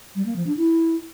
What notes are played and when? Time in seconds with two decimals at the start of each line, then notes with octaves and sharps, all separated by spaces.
0.16 G3
0.26 A#3
0.36 F3
0.46 D4
0.57 E4